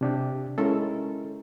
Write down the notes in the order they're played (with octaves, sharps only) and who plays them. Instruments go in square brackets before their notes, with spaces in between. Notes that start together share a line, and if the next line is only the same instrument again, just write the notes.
[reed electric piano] C3 D4 G4
[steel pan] G#3 C#4 E4 [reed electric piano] A4 A#4